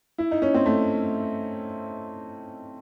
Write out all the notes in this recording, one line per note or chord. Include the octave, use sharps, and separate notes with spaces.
E4
D#4
C#4
C4
A3